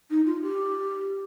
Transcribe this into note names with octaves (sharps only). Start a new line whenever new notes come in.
D#4
F4
G4